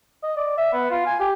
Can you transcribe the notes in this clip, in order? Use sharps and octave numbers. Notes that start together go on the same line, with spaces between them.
D#5
D5
E5
B3
F4
G#5
G4